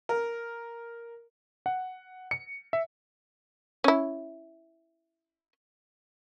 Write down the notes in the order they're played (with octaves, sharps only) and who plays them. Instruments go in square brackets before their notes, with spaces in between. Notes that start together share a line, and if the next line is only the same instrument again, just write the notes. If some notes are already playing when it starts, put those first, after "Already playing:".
[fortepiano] A#4
[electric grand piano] F#5
C#7
E5
[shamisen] C#4 E4